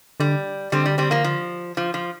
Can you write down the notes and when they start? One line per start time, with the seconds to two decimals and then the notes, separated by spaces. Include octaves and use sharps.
0.20 D3 G3
0.72 D3 G3 C4
0.86 G3
0.98 G3 C4
1.11 F3 A#3
1.24 F3
1.77 F3
1.94 F3